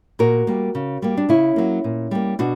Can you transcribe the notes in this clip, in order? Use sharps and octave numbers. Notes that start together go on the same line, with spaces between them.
A#2 F#4 A#4
G3 A#3
C#3
G3 A#3
D4
C#3 C#4 E4
F#3 A#3
A#2
G3 A#3
B2 D4 F#4